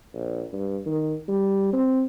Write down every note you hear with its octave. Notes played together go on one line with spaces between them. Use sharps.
A#1
G2
D#3
G3
C4